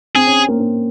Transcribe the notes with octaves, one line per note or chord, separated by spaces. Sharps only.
C4 G#4
C#4
A#3
A#3